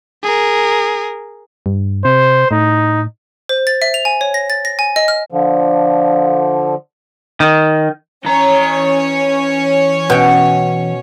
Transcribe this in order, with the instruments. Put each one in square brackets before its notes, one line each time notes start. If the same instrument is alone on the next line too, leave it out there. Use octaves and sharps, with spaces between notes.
[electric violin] G#4 A#4
[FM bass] G2
[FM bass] C3 [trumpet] C5
[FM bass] A2 [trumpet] D#4
[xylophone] C5
A6
E5
F7
G#5
C#5
A#6
A6
A#6
G#5
D#5
F6
[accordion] D3 F3
[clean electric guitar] D#3
[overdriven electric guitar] E3 A#5 [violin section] C#4 C#5
[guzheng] B2 G5